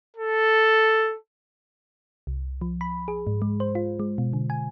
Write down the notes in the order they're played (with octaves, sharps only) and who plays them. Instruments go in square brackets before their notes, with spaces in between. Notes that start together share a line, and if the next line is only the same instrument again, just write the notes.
[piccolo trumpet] A4
[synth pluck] C2
F3
B5
G#4
G#2
G#3
C5
F4
G#3
B2
D3
G#5